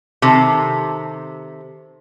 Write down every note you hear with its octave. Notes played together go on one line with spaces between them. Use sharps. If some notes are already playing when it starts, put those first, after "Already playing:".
C3 D#3 A4